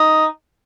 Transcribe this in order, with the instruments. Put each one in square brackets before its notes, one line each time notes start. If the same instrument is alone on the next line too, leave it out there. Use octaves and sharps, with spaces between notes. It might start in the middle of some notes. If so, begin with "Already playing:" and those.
Already playing: [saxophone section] D#4